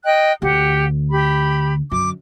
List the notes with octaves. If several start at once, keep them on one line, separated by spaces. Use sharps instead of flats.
D#5 G5 F#6
D2 D3 G4 F#5
G4 B5
F#2 D3 D6